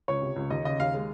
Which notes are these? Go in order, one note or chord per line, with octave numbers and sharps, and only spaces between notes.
C#2 C#5
C3
C#2
D#2 D#5
C#3 D#5
D#2 F5
G#3